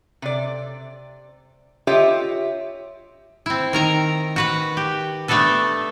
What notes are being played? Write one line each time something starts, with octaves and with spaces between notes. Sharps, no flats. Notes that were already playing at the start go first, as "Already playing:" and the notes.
C3 D5
F4 G4 C#5 D#5 E5
C4 E4
D#3 A#4 A#5
F#4 B4 F#5
G4
A3 B3 D4 A4 B4